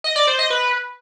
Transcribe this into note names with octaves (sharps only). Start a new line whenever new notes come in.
D#5
D5
C5
D#5
B4